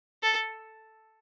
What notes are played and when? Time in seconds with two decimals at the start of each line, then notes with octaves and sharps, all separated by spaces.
0.23 A4